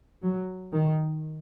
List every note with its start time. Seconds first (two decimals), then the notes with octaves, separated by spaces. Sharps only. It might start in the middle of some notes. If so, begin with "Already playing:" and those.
0.23 F#3
0.73 D#3